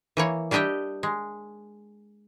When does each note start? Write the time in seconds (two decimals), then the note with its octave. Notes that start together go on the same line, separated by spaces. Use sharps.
0.17 E3 A#3 C#5
0.51 G3 D4 G4 D#5 E5 G5
1.03 G#3